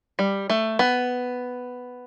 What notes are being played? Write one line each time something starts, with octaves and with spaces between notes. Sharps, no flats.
G3
A3
B3